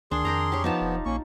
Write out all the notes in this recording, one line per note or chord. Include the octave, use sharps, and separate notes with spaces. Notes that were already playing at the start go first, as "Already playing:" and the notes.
D2 D#3 D4 G#4 C6
F2 A#4 G5 A#5
G4 C#5
F3 B3 D#4 F4 A5
E1
A#1 A#3 C#4 C#6